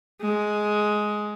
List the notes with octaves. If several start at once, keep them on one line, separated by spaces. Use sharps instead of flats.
G#3